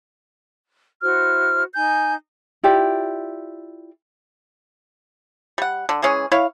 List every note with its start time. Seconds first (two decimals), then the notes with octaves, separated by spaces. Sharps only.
1.03 E4 F#4 C5 F6
1.74 D#4 G#5 G6
2.63 E4 F4 G4 D5
5.58 G3 F#5
5.89 D3
6.02 E3 G#3 C#4 G#4
6.32 E4 C#5 F5